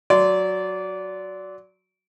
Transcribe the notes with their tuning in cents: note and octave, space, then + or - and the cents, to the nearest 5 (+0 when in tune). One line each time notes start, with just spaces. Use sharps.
F#3 +0 D5 -20 C6 -15